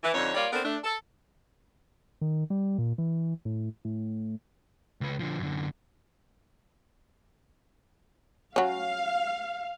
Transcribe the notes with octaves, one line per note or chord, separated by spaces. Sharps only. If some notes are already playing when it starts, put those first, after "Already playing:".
E3
F2 D3 D#4 C#5
G3 A#3 F4 C#5 D5
B3 C4 D4 A4 A#4
A3 D4
A4
D#3
G3
A#2
E3
A2
A2
C#2 B4
D3 F3
F#2 D3
F#3 C#4 F5